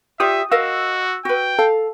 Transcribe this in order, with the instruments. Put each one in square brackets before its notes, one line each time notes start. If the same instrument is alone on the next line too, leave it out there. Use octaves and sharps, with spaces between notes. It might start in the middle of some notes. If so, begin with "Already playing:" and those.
[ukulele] F4 G4 D5 [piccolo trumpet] E5 [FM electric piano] D#6
[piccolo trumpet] F#4 [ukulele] A#4 D#5 F5 [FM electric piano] E6
[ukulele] F#4 B4 [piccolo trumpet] G5
[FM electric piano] A4 [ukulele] F5